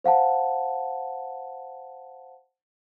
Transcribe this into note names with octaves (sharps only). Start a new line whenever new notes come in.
C5 F5 F#5 A5